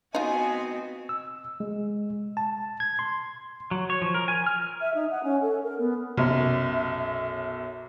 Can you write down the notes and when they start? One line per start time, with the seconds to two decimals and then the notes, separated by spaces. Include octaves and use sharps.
0.15 B3 C4 D#4 F4 F#4 D#5 G#5
1.09 E6
1.60 G#3
2.37 A5
2.80 G#6
2.99 C6
3.71 F#3
3.90 C#5
4.02 F3
4.14 A#4
4.28 G#5
4.46 F6
4.81 E5
4.94 D#4
5.10 F#5
5.23 C#4
5.41 A4
5.63 A#4
5.79 B3
6.18 B1 F#2 C3 E5